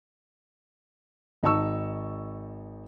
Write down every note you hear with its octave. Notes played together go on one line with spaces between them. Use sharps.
G#1 D#4 A5 C#6 E6